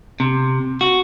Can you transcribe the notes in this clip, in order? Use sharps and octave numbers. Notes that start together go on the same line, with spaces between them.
C3
F#4